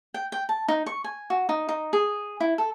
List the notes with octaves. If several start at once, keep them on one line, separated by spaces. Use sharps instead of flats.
G5
G5
A5
D#4
C#6
G#5
F#4
D#4
D#4
G#4
E4
A4